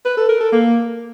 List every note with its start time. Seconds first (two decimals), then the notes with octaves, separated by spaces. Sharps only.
0.05 B4
0.17 A4
0.29 A#4
0.41 A4
0.52 A#3